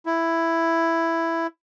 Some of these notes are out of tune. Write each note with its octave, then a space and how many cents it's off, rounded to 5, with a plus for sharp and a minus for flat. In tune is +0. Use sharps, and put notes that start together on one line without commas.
E4 +5